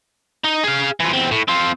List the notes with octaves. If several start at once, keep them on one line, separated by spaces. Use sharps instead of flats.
D#4
G#4 F5
E3 F3
E2 C4
A2
C4 F4